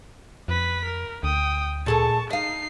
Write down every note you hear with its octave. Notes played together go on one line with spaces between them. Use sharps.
F2 B4 B6
A#4
D2 G5 D#6
A#2 G#4 A4 A5 C#6
D#4 D#5 F5 C7